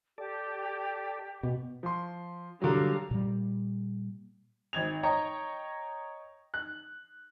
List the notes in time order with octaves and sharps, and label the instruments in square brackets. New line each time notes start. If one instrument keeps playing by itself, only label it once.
[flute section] G4 [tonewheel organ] A4 D5
[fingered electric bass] B2
[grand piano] F3 C6
[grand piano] D3 F#3 [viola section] G3 F5 A#5
[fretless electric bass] A#2 G3
[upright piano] G#1 G#6 F7
C#5 D#5 G5 A#5 C#6
F#6